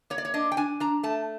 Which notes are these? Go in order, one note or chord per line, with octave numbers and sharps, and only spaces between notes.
A#3 C#5
D5
C#5
D4 D#5
G5
D4 G#5
D4 A#5
A3 A5